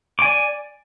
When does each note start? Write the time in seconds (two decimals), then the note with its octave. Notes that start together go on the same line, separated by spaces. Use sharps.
0.19 D6
0.22 G#5
0.25 D5